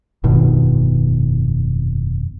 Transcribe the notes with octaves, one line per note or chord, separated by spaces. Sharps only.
F1 G2 B2 D#3